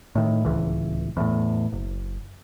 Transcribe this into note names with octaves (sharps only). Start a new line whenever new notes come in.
A2 D#3
D1 G#1 C#2 E3
E2 A2
F#1